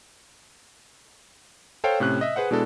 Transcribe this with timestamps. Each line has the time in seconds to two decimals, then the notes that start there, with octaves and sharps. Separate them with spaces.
1.84 A4 C5 C#5 F5 G5
2.00 A2 C3 C#4 F#6
2.21 D#5 E5
2.36 G#4 B4 C5 F#5
2.51 B2 G#3 D4 E4 A4